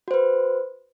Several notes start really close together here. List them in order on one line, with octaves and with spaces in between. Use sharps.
F#4 C5 B4